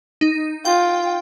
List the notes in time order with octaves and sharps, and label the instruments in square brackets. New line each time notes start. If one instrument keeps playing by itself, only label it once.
[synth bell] D#4
[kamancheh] F4 [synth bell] G5